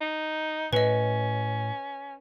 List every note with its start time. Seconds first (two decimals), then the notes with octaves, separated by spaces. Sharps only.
0.01 D#4
0.73 A2 C#4 B4 D#5